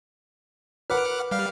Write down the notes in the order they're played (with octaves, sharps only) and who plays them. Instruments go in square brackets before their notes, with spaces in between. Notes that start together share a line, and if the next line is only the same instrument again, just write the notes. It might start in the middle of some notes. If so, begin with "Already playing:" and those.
[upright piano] A#4 B4 [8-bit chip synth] F#5 D6 F6
[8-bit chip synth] G3 F5 F6